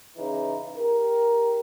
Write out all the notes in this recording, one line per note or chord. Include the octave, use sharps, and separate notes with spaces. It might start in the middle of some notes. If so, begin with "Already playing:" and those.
C#3 E3 D#4
G4 A#4